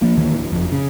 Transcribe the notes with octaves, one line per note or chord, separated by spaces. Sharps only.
F3 A#3
D2 D#3 E3 A#3
D1
F#1 F2
C#3